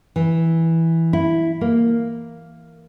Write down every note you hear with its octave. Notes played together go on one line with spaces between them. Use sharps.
E3
E4
A#3